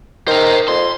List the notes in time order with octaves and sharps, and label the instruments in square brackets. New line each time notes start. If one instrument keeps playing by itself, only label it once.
[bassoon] D#3 [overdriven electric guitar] C5 A#5
[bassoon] F2 [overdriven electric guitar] C6